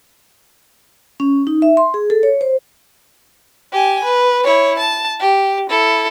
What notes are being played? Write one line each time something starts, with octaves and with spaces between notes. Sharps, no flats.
C#4
D#4
E5
C6
G#4
A4
C#5
C5
G4 G#5
B4
E4 C#5
A5
G4
E4 A4